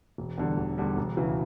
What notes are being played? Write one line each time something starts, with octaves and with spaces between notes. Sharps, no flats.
E1
E2 D3 G3
E1
E2 D3 G3
E1
D2 C#3 E3